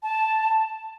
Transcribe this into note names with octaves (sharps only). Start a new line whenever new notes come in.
A5